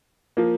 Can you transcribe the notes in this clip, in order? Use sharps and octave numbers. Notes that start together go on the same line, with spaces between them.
F3 A#3